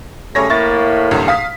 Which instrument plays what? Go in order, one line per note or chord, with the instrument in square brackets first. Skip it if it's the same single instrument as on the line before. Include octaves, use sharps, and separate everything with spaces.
[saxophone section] C#3 G3 A3 [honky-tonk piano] C#4 C#5 A#6
[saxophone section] A2 A#3 [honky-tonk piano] E4 C#6 A6
[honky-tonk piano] G#1 C#2 G2
F5 D#6 B6